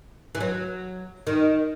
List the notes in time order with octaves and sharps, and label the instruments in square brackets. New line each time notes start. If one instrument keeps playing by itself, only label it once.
[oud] E3
F#3
D#3